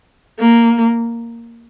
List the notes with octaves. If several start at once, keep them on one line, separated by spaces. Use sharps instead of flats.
A#3